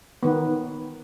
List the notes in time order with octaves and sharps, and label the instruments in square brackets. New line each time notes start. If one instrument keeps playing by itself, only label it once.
[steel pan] D#3 B3